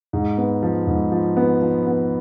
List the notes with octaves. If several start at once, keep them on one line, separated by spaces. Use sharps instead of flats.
G#2
B3
F3
G#2
F3
B3
F3
B3